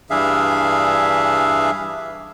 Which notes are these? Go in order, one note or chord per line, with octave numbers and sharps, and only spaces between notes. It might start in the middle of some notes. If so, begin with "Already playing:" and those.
G2 E3 D4 G#4 E5 F5